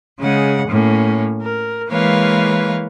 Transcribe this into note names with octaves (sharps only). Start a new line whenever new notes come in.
C#3 G#3 F#5
A2 A#3 C#4
A#4
E3 G#3 A#3 B4 C#5 F5